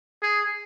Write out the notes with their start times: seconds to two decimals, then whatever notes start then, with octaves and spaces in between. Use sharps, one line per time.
0.23 G#4